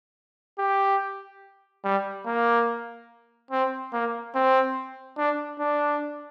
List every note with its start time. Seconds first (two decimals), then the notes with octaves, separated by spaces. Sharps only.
0.59 G4
1.85 G3
2.26 A#3
3.51 C4
3.93 A#3
4.35 C4
5.18 D4
5.59 D4